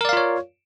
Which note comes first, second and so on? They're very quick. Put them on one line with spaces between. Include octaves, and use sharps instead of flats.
A#4 D5 F5 F4 C#5